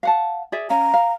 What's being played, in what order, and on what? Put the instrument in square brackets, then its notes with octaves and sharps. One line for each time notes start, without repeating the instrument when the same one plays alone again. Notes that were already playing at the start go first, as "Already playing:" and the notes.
[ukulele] F5 F#5 A5
G#4 D5 E5
[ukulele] C#4 F5 [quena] A#5
[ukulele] F5